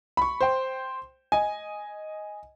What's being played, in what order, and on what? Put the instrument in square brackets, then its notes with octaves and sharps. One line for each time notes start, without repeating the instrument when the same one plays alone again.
[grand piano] B5 C#6
C5 G5
D#5 G#5